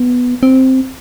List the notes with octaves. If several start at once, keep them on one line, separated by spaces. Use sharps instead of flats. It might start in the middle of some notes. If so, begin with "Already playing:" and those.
Already playing: B3
C4